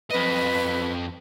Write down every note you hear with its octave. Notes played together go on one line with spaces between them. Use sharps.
F2 B4 D#5